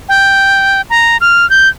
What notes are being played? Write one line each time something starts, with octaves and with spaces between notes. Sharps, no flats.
G5
A#5
F6
G6